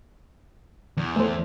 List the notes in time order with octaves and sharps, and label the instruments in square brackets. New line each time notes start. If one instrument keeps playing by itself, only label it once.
[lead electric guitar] E2
[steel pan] A3 C5